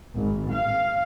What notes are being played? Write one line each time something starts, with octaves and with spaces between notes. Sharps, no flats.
G#1
F5